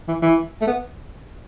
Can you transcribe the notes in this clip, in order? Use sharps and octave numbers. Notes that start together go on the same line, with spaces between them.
E3
E3
A3
B3